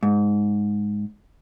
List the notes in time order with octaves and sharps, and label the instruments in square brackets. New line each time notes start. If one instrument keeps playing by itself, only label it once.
[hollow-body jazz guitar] G#2